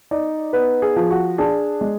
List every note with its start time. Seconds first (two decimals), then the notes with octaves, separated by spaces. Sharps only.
0.11 D#4 D5
0.53 B3 B4
0.82 G#4
0.96 F3
1.10 F#4
1.38 D4 G#4
1.81 G#3